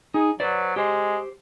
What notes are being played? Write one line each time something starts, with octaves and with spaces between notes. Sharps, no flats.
D#4 G#4
F#3 B4 C5 D5
G#3 G4 C5